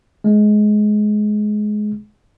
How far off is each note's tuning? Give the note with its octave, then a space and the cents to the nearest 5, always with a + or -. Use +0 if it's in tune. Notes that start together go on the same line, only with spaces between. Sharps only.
G#3 +20